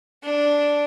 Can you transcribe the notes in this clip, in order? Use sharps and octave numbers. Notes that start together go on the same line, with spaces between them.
D4